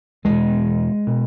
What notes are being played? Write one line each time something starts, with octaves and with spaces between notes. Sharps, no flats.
E2 B2 G#3
B2